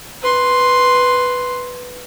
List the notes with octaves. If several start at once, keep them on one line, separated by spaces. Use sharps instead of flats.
B4 C6